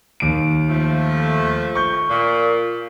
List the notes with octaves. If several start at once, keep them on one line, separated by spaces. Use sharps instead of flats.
D#2 D7
F3 A3
C#6 G6
A#2